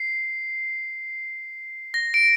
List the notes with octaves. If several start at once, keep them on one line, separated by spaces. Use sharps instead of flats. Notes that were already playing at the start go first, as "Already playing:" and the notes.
Already playing: C7
A#6
D7